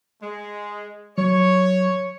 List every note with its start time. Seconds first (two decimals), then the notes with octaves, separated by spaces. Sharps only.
0.22 G#3
1.18 F#3 C#5